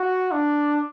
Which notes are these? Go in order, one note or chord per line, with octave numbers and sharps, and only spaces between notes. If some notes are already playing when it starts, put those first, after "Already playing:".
Already playing: F#4
D4